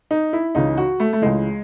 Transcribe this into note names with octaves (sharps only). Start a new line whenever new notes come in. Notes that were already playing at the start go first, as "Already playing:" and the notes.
D#4
E4
C#2 C#3 E3 D#4
F#4
A3
A3
C#2 C#3 E3 G#3